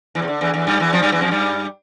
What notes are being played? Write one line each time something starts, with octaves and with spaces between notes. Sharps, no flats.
E2 E3
C3
D3
E2 E3
E2 E3
G2 G3
E2 E3
F2 F3
G2 G3
E2 E3
F2 F3
G2 G3